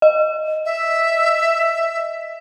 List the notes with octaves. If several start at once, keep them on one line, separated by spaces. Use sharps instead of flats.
D#5
E5